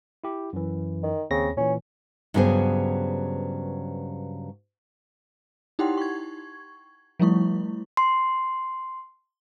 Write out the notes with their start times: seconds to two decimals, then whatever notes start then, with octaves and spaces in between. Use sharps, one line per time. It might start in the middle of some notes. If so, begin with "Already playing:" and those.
0.24 E4 G4
0.53 F#2 E3
1.03 D#3
1.30 D#2 C#3 C4 A#6
1.57 A#2 E3 C#4
2.34 G2 C#3 F#3 B3 G#4 C5
5.79 D#4 E4 G4 F#5 G5 C6
5.97 C#6 G#6
7.20 F3 G3 A3 E4 C#6
7.97 C6